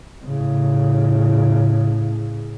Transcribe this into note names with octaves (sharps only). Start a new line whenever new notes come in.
A2 C#3